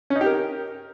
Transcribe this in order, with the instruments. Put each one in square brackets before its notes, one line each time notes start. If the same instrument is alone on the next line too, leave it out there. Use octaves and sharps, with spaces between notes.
[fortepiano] C#4
D#4
G4
A#4